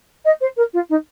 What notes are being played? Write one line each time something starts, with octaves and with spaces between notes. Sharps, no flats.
D#5
C5
A#4
F4
D#4